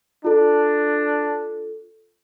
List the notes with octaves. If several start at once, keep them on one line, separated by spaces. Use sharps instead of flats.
D4 F4 A4